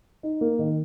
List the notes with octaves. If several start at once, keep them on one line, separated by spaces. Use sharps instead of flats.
D#4
A#3
D#3